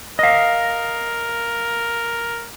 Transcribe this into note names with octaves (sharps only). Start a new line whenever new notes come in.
A#4 D#5 F5